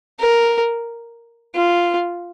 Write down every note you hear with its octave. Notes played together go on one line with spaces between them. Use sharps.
A#4
F4